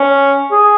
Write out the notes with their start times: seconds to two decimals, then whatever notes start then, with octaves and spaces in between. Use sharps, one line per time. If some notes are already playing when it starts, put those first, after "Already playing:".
Already playing: C#4
0.52 G#4